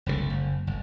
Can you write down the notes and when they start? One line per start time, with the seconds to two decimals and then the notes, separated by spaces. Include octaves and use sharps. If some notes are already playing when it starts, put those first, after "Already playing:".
0.06 F#1 C2 A#2 A3
0.30 F#1
0.67 G1